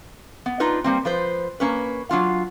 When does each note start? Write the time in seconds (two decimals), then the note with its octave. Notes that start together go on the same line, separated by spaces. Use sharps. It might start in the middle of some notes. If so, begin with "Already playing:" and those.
0.46 B3
0.60 D4 D#4 F4 B4
0.84 G3 A#3 C4
1.05 F3 B4 C5
1.60 A#3 C#4 B4
2.09 F#3 D4 F4 F5